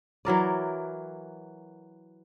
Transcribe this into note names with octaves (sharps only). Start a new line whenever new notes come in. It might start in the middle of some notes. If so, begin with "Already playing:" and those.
E3 F#3 A#4 D5